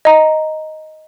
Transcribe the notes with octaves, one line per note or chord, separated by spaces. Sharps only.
D#5 A#5